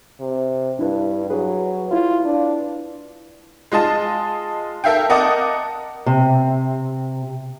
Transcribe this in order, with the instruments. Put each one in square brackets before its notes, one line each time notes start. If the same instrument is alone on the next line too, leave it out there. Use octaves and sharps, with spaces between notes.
[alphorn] C3
[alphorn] G2 [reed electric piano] D4 E4 B4
[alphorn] F#3 [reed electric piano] G#4 B4
[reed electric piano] E4 B4 [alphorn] F4
[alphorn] D4
[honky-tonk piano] G#3 F4 D#5 A5
A4 A#4 E5 F5 G5
A#4 D#5 F#5 A5 D6 D#6
[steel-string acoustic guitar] C3